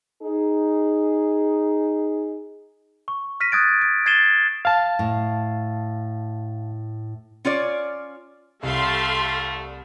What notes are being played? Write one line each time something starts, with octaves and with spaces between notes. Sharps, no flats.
D#4 G#4
C#6
F6 A#6 B6 D#7
D#6 F#6 G#6 A6 D7
D7
G#6 A6 C7 D#7 E7 G7
F5 A5
A2
C#4 F4 C#5 D5
C2 G3 A3 A4 F5 C6